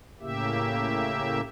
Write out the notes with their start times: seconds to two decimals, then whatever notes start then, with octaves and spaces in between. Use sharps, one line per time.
0.20 A2 C#3 A#3 G4 E5